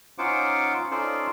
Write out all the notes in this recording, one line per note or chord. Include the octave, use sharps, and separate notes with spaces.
C#4 D#4 F4 C5 F#5 D6
C#4 D#4 F4 A4 C5 D5